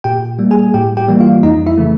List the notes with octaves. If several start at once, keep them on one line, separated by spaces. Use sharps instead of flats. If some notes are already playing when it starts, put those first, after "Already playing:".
A#2 G4 G5
G3 A#3
G#4 G#5
A2 G4 G5
G4 G5
E3 G3 A#3
F4 F5
F2 D#4 D#5
E4 E5
C#3 E3 A3